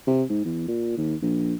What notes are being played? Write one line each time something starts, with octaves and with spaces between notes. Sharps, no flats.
C3
G#2
E2
A#2
D#2
A#1